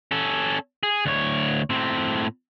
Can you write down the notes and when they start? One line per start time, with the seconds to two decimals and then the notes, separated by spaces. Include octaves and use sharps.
0.11 C#4 A4
0.83 G#4
1.06 D2 C#5
1.70 A2 C4